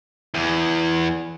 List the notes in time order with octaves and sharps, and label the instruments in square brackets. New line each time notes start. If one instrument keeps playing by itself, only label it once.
[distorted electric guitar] E2